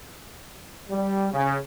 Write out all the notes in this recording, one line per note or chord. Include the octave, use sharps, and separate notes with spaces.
G3
C#3